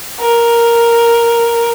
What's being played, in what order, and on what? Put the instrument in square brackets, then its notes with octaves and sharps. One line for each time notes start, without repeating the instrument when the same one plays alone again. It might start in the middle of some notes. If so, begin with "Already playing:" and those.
[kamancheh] A#4